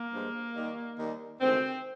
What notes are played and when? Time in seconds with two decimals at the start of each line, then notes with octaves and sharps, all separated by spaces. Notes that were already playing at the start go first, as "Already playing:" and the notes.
Already playing: A#3
0.12 G2 F3 G#3
0.55 D#2 D#3 G3
0.98 D#2 D#3 G3
1.41 D2 C3 D#3 G#3 C4